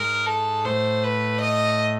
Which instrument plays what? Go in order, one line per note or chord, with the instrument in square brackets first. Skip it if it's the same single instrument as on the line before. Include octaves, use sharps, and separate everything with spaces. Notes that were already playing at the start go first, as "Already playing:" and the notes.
Already playing: [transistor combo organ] G#2 [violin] A#4
[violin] A4
[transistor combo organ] A2 [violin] C5
[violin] B4
D#5